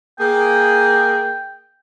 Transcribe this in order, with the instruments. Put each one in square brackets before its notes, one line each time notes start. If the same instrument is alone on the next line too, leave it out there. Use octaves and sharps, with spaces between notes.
[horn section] A#3 G#4 [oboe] G5